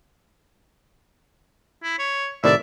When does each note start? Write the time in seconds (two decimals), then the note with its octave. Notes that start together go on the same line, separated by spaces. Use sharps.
1.83 E4
1.99 C#5
2.44 A2 C3 D#3 D5 E5